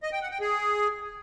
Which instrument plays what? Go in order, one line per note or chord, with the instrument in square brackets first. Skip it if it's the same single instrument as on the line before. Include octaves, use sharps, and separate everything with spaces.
[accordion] D#5
G5
F#5
G5
G#4